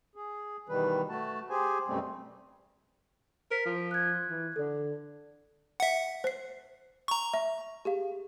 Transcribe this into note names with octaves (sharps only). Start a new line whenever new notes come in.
G#4
B2 D#3 E3 G3 B4
A3 F#4 A5
G4 G#4 C5 G#5
F#2 B2 G3 A3 C4
A#4 C5 B6
F3
F#6 G#6
E3
D3 A4 D5
E5 F#5
C5 C7
A#5 C#6
E5
G4 G#4 F5